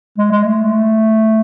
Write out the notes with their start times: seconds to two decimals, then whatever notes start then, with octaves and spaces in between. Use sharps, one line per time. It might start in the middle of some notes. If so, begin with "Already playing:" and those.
0.18 G#3
0.32 G#3
0.44 A3